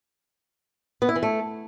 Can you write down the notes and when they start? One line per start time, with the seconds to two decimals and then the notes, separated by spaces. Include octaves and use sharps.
1.02 B3
1.09 E4
1.16 E3
1.23 A3